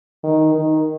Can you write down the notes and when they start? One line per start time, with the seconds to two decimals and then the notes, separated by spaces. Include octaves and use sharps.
0.23 D#3
0.55 D#3